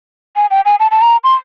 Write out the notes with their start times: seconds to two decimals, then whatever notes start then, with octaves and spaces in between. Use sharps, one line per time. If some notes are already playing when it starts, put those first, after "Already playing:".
0.36 G#5
0.51 G5
0.65 G#5
0.80 A5
0.91 A5
1.01 A#5
1.24 C6